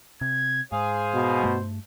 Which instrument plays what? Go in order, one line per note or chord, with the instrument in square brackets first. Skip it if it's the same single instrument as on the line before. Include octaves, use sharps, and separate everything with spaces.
[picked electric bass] C3 [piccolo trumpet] G#6
[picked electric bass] G#2 [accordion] G#4 F5 G#5 [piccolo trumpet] C5
[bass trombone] B2
[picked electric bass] G2 A3